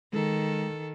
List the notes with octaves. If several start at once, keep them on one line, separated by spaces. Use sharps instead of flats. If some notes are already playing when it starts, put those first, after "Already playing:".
D#3 G#3 A4